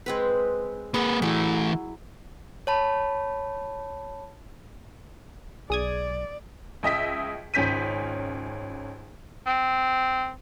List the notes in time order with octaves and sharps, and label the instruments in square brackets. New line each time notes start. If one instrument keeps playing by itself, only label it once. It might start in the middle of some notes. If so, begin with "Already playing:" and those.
[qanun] G#3 C4 B4
[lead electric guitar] A#3 B4 [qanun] G#4 F#5
[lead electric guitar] E3 A3 [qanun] F#3 E4
[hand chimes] C#5 A5 B5
[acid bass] B1 [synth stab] G#4 D#6 G#6 [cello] D5
[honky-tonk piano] C#2 D#5 E5 B6
G#1 C#2 C#4 G6 B6 D#7
[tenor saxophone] C4